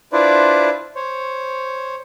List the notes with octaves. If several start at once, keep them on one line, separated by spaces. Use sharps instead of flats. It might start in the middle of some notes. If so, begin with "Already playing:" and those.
D4 E4 F4 B4 C5 D5
C5 C#5